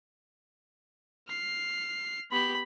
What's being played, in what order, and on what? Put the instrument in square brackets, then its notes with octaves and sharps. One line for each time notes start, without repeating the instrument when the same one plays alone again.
[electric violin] F6 C7
[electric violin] B3 G4 [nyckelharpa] B5